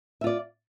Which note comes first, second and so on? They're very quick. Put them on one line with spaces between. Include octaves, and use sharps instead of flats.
E5 F4 D5